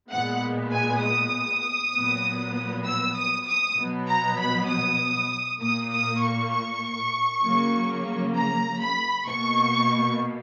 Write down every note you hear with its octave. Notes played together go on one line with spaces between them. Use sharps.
A#2 G#3 B3 F#5
G#5
D#6
A#2 F#3 B3
E6
D#6
D#6
B2 F#3 B3
A#5
B5
D#6
A#2 A#3 D#6
D#6
C#6
C#6
C#3 F#3 A#3
A#5
B5
B2 A#3 C#6